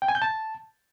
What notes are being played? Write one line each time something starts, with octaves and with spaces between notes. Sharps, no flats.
G5
G#5
G6
A5